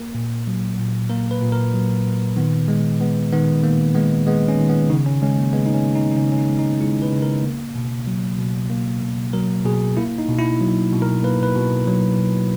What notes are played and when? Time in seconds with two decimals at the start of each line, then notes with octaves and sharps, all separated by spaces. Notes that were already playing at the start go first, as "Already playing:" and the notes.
Already playing: A#3 A#4
0.15 A#2
0.47 F#3
0.79 A#2
1.10 A#3 A#4
1.31 B4
1.42 A#2
1.52 A#4
1.74 F#3
2.05 A#2
2.37 D#3 B3
2.68 G#3
3.00 G#3 B3
3.32 D#3 B3
3.63 D#3 A#3
3.95 G#3 B3
4.27 G#3 B3
4.48 C#4
4.58 D#3
4.69 B3
4.90 C#3 D#4
5.06 C#4
5.22 G#3 C#4
5.38 A#3
5.53 G#3 B3
5.66 D#4
5.74 C#4
5.85 C#3
5.95 D#4
6.11 D#4
6.16 C#3 C#4
6.32 C#4
6.38 D#4
6.49 G#3
6.59 D#4
6.80 G#3 E4
7.02 B4
7.13 C#3
7.22 A#4
7.43 A#3
7.75 B2
8.07 F#3
8.39 B2
8.70 A#3
9.03 B2
9.33 F#3 A#4
9.65 B2 G#4
9.97 A#3 E4
10.18 D#4
10.29 B2
10.39 E4
10.61 F#3
10.92 B2
11.02 A#4
11.23 A#3 B4
11.43 B4
11.56 B2
11.87 F#3
12.18 B2